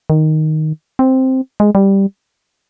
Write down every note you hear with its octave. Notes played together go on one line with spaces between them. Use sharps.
D#3
C4
G#3
G3